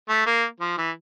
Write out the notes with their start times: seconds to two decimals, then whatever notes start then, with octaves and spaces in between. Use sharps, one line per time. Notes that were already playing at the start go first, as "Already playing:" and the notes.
0.09 A3
0.26 A#3
0.60 F3
0.78 E3